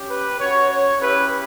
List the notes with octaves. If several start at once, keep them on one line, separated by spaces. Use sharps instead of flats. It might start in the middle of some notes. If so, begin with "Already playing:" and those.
Already playing: C#4 G4
B4
C#4 F#4 C#5
C#5
C#4 E4 G4 B4